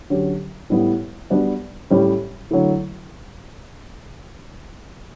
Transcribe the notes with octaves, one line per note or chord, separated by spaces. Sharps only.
D3 F#3 C#4 G4
A2 G3 B3 E4
G3 B3 D4 F#4
A2 G3 C#4 G4
D3 F#3 A3 E4